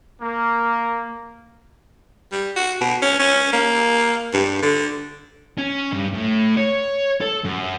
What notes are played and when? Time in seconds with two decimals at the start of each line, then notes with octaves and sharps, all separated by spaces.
0.22 A#3
2.32 G3
2.56 F#4
2.81 B2
3.02 C#4
3.20 C#4
3.53 A#3
4.33 G2
4.63 D3
5.58 C#4
5.92 G2
6.14 A2
6.57 C#5
7.21 A4
7.44 F#2